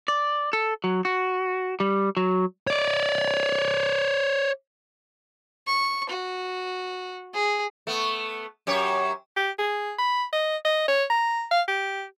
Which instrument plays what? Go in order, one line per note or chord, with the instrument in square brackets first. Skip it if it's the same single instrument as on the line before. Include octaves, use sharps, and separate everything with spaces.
[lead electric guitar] D5
A4
F#3
F#4
G3
F#3
C#5 D5
[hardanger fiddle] C#6
F#4
G#4
[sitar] A3 B3
F#2 G4 C#5
[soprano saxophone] G4
G#4
B5
D#5
D#5
C#5
A#5
F5
G4